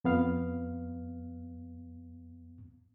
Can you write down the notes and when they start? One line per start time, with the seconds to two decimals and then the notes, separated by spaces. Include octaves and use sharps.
0.04 F2 B3 F5